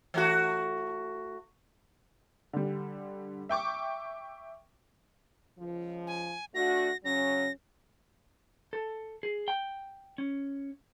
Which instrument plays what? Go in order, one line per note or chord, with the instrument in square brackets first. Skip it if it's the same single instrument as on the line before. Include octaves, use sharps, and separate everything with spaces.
[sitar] E3 A3 F#4
[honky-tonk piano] D3 G3
E5 G5 C#6 D6
[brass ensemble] C#2 F3
[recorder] G#5
[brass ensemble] A3 D4 F#4 [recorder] A#6
[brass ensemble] C#3 F#3 C#4 [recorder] A#6
[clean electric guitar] A4
G#4
G5
C#4